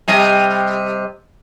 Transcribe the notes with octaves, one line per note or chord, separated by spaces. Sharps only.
C3 G3 D#5